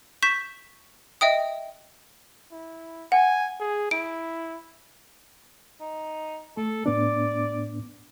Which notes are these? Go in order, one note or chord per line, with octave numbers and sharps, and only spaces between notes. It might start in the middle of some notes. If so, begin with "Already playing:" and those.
C#6 G6 B6 E7
D#5 E5 G5 D#6
E4
F#5 G#5
G#4
E4 D7
D#4
A3 A4
A2 B3 D4 D5